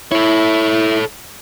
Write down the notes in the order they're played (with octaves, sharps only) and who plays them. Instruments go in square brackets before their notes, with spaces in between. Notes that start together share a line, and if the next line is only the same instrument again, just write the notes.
[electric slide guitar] E4 [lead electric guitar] A4 C#5